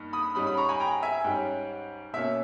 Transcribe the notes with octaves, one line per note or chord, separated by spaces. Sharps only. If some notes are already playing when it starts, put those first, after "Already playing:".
Already playing: G2 A#3 D#4
B5 D#6
G#2 G3 C#4 B5 D#6
B5 D#6
A#5 C#6
G#5 B5
G5 A#5
E5 G#5
G#2 G3 C#4 G5
B2 A#3 C#4 E5